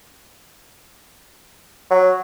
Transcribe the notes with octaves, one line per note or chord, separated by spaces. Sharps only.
F#3